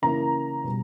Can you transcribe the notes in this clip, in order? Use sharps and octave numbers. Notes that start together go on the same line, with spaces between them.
C#3 E3 A#3 A#5
B2 G3